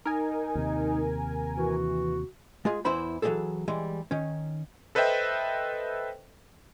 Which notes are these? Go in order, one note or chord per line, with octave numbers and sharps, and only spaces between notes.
D#4 A#4 G#5
D#2 C3
E3 F#4
G#3 F4 G#4
E2 E3 E4 C5 B5
E3 F#3 G#3 A#3 G#4 A4
E3 G3 G#3
D#3 C#4
A4 B4 C5 D#5 E5 G5